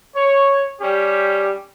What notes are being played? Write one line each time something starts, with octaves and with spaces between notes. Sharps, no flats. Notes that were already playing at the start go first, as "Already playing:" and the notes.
C#5
G3 C#4 G4